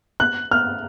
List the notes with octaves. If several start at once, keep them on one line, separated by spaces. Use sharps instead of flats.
F#6
F6